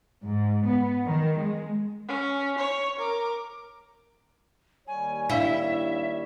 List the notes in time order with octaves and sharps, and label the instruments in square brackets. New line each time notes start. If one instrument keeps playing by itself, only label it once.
[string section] G#2
B3
D#3
G#3
[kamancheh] C#4
C#5
A#4 D6
[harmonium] D#2 G3 C#5 [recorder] G#5
[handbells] D4 F5 B6 [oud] E4 [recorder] E5